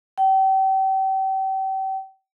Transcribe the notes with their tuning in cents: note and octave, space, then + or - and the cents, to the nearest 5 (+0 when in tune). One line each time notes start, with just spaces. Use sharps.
G5 -35